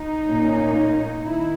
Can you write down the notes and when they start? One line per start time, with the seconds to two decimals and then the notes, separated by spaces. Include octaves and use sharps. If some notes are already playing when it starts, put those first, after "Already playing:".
Already playing: D#4
0.29 A#2 A#3 C#4
1.25 D#3 E4